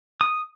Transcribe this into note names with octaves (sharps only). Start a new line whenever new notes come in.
D#6